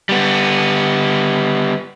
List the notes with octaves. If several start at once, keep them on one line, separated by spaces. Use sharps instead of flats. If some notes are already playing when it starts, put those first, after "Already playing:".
G3 B3